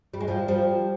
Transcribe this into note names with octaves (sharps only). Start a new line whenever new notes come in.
G3
G#3
F3 G3
F3 G3